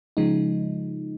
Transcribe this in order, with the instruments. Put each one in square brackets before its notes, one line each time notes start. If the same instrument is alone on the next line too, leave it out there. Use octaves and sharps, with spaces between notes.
[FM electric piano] C#3 F3 G#3 D#4